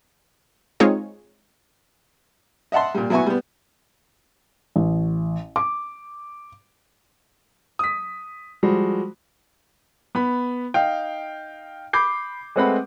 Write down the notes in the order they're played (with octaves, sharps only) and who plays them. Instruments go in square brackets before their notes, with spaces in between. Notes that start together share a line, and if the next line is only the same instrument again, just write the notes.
[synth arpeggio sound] G#3 C4 D#4 F4 G#4 C#5
[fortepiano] D#5 E5 F#5 A5 C6
A#2 G3
F#3 B3 E4 F#4 G#5 C#6
G3 B3
[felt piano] A1
D6
[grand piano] D#6 B6
F3 G3 G#3 F#4
[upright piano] B3 B5
D#4 F5 G5
B5 D6 G6 C7
G#3 A3 C4 B4 F#5 B5